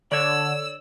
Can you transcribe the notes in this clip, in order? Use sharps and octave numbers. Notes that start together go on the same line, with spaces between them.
D3 C#5 D5 E6